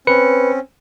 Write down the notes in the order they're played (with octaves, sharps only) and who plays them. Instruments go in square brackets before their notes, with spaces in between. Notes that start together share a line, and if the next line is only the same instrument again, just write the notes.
[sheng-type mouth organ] C4 C#4 [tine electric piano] B4 C#7